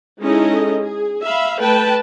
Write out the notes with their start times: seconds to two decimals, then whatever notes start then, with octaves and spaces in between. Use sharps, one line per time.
0.22 G#3 C#4 D#4 E4 A4 D#5
0.82 G#4
1.24 E5 F5 B5
1.60 A3 B4 G5 A5